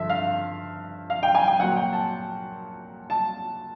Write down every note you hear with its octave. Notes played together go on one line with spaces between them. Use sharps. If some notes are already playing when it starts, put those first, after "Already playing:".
Already playing: G2 D3 F3 E5
F5
F5
G5
G#5
G5
A#2 F#3 F#5
G5
A5
A5